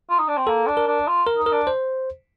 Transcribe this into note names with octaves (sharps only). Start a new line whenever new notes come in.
F4
D#4
D4
C4
A#3 A4
D4
A#4
D4
F4
A#4
D#4
A#4
D4
C5